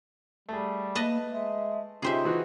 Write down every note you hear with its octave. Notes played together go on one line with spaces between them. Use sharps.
G3 A3 G#4
A#3 B4 D#5 A5
G#3 E5
C#3 D#4 F4 G4 G#4 C5 E5
E3 F#4